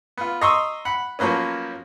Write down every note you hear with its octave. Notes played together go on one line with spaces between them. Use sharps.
B3 F4
D#5 A#5 C6 C#6 D#6 E6
F#5 B5
F3 F#3 A#3 B3 C#4